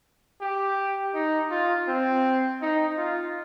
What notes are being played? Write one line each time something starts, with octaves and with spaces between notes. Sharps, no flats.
G4
D#4
F4
C4
D#4
F4